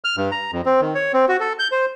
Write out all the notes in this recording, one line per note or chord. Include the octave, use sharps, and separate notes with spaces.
F6
G2
A#5
F2
C4
D#3
C#5
C4
F#4
A4
G6
C5